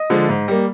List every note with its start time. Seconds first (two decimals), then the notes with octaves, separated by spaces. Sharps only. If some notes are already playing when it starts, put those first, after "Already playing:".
Already playing: D#5
0.10 D3 F3 G#3
0.29 G#2
0.48 G3 A#3